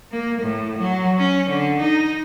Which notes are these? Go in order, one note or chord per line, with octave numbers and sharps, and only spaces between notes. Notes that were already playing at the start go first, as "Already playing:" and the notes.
A#3
A2
F#3
C#4
D3
D#4